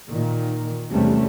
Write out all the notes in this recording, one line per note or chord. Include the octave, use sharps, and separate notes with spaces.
A#2 D#3
E2 C3 G3 A3 C#4